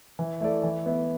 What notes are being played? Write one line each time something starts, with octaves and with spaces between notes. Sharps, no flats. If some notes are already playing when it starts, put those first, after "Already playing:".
E3
A3 E4 A4 D5
E3
B3 E4